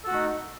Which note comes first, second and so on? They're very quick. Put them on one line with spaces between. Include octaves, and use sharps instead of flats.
A4 F#4 A3 D#4